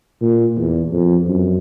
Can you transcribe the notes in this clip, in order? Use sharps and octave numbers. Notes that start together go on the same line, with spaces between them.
A#2
E2
F2
F#2